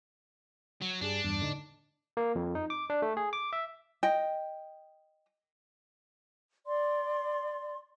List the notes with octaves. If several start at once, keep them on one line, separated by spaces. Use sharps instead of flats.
F#3
G2 G3 D4 G#4
E2 G2
A2 D3 D#4
A#3
F2
D#4
D6
D4
A3
G#4
D6
E5
D#5 G5
D5 C6